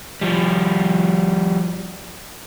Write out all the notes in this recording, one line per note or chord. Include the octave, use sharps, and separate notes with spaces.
F3 G3